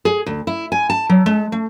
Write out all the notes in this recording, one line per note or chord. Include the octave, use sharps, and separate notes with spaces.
G#4
D2
E4
G#5
A5
F#3
G#3
A3